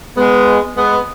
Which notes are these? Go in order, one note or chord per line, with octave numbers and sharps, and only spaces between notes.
G#3 B3
G#3 B3